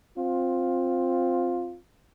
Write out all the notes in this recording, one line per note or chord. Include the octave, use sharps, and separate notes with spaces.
C4 F4